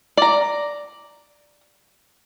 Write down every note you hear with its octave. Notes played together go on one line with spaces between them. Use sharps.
D5 A#5